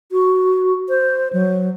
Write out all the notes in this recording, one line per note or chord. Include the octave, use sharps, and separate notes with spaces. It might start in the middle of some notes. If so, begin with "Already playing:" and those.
F#4
C5
F#3